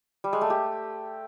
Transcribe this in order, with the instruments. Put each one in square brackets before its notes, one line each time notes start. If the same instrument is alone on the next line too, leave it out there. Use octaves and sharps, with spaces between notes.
[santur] G3
G#3
A3
G4